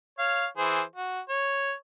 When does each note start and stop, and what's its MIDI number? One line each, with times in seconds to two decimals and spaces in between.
0.19 0.46 73
0.19 0.46 77
0.58 0.82 52
0.58 0.82 68
0.58 0.82 72
0.96 1.20 66
1.29 1.72 73